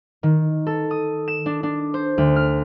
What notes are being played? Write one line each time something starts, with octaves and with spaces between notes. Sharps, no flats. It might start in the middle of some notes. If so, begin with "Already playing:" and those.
D#3
A4
D#6
E7
D4
D4
C5
D2
F6